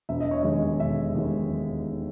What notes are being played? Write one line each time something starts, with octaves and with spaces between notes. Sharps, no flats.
E1 E5
D#5
C#5
D#2 D#3 G#3 D#5
E1 E5
D#2 D#3 G#3